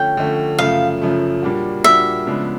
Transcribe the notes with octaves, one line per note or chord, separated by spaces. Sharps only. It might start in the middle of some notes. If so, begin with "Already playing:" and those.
Already playing: D3 F3 A3 C#4 G5
D3 F3 A3 C#4
F#2 C#3 F3 A3 F5
F#2 C#3 F3 A3
A#2 G3 A#3 D4 F#4
A#2 G3 A#3 D4 F#4 E5
C#3 F3 G#3 B3 D4